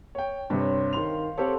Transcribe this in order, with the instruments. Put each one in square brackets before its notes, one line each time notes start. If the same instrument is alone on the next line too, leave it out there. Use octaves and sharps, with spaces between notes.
[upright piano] C#5 G5
[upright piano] G2 C3 [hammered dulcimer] C5 C#5
[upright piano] D#3 F7 [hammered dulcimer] F5 C6
[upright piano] C4 G4 C#5 [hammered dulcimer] A4 F5 F#5